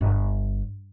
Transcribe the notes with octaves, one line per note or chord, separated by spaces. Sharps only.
G1